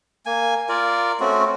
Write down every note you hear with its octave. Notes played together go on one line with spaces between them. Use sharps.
A#3 G#5
F4 A#4 D5
A3 C4 C#4 F#4